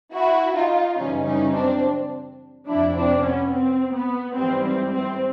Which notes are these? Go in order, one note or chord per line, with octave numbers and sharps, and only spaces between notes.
E4 F#4
D#4 F4
F#2 C#3 E3 G3 C#4 D#4
C#4 D#4
C4 D4
F2 C3 F3 D4 E4
C4 D4
B3 C#4
C4
B3
G#2 E3 G3 C4
C4
C4